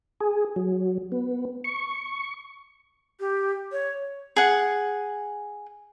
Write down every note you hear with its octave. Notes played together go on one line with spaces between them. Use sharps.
G#4
F#3
B3
C#6
G4
C#5
G#4 F#5